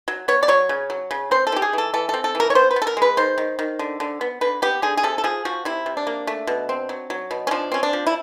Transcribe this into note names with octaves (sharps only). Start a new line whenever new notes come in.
F#3
B3 C#5
D5
F#3 C#5
C#3
F#3
C#3
C4 C5
A4
E3
G4
G#4
E3 A4
E3 A4
C4 A4
A4
E3
A#4
C#5
B3 C5
B4
B3
A4
A#4
G#3 B4
D#3 C5
D#3
D#3
D3
D3
B3
D3 B4
B3 G4
D3 G#4
G#4
C3 A4
A4
F3 G#4
F3 F#4
C3 E4
C3
D4
A#3
A3
B2
C4
F#3
F#3
B2
C#4
F3 D4
C4 C#4
D4
F3
E4